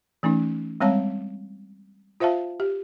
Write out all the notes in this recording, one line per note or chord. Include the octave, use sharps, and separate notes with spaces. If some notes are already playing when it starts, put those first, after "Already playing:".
E3 A3 C#4 D#4
G3 G#3 C4 C#5 F5 A5
F4 C5 E5 F5 A5
G4